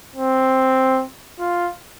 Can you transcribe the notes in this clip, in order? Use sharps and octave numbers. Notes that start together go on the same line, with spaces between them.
C4
F4